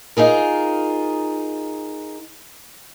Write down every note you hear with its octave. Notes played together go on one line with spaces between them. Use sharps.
D#4 F4 G#4 A#4